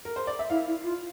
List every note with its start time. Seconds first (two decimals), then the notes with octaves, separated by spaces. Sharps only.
0.05 A#4
0.16 C5
0.27 D5
0.39 E5
0.50 E4 F5
0.68 E4
0.84 F4